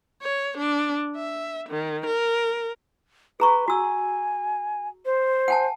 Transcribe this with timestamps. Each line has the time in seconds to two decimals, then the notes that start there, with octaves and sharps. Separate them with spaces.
0.22 C#5
0.58 D4
1.16 E5
1.69 D#3
2.06 A#4
3.40 G#4 B4 A#5 C#6
3.68 F#4 G#5 E6
5.05 C5
5.48 F#5 G#5 A5